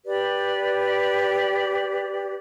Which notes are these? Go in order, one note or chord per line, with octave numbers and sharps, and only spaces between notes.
G4 B4 D5